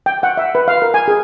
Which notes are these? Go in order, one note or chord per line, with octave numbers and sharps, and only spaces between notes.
G5
F#5
E5
B4
F5
A#4
G#5
G#4